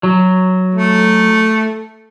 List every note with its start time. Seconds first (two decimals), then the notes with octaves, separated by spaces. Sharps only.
0.03 F#3
0.75 A3